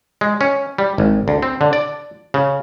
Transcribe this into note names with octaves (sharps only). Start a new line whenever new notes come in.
G#3
C#4
G3
G#1
D2
C4
D3
D5
C#3